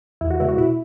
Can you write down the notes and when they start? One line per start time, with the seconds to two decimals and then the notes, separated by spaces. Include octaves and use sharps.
0.21 E2 E4
0.30 F#4
0.40 C#3 G#3 B3 E4
0.49 F#4
0.57 B2 E4